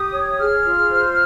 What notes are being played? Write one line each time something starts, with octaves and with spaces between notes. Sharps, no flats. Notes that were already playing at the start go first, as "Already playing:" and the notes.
Already playing: G4 D#6
C#5
G#4 F6
F4
C5